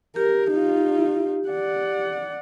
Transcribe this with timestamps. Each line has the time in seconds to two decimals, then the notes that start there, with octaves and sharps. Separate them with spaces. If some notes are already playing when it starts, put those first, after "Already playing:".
0.16 G4 A#4
0.51 D#4 F4
1.49 D5 F#5